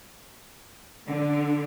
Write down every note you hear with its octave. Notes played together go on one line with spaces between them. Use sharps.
D3